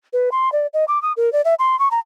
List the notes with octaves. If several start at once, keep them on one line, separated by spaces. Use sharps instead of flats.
B4
C6
D5
D#5
D6
D#6
A#4
D5
E5
C6
C#6
A#5